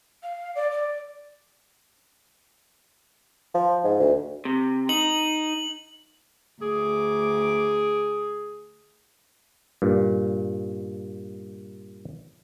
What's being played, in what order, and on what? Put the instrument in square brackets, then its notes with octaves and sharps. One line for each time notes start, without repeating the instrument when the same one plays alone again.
[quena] F5
D5
D5
[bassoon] F3
G#2
D2
[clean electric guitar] C3
[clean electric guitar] D#4 [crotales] F#7
[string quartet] D2 D6 [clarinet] G#4
[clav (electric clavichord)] G2 A#2